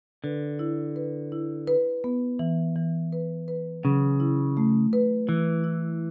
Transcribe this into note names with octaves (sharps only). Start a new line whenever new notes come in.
D3 B4
E4
B4
E4
B4
B3
E3
E3
B4
B4
C#3 F#3
E4
A3
B4
E3 E4
E4